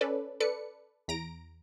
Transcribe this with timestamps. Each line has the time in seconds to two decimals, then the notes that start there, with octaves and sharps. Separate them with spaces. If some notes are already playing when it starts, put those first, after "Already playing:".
0.01 C#4 A4 B4 D5
0.40 A4 B4 D5 C#7
1.08 E2 A#5 A#6 D7